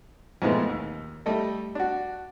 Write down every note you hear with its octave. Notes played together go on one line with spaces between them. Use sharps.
F2 G#2 B2 E3 G#3 A3
D#2
G3 A3 A4 D#5
D4 F#4